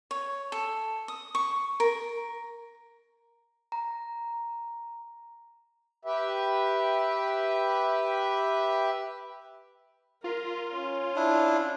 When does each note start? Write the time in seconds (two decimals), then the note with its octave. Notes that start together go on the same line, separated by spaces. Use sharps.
0.11 C#5
0.52 A4
1.08 D#6
1.35 C#6
1.80 A#4
3.72 A#5
6.05 G4 B4 E5
10.24 F4 A#4
10.74 C#4
11.16 D4 E4